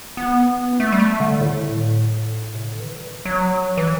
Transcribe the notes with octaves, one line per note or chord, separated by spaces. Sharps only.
B3
A3
G3
A3
D3
A2
C3
D3
E3
G3
E3
F#3
E3